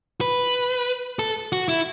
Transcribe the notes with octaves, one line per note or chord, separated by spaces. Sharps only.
B4
A4
F#4
E4